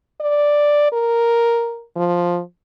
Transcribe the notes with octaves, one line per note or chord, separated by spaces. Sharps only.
D5
A#4
F3